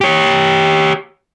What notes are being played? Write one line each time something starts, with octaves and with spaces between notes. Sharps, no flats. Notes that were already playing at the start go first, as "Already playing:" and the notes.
G4 C#5